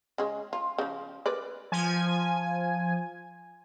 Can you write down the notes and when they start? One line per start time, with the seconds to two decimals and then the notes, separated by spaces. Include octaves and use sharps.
0.18 C#3 G#3
0.53 F4
0.78 C#3 F3
1.26 A#4 B4 D5
1.72 F3 G#5